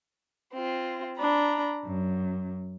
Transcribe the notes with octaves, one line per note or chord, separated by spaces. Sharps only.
C4 F4
D4 A#5 B5
F#2